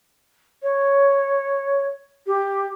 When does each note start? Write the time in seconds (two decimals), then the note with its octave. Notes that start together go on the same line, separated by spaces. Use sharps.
0.62 C#5
2.27 G4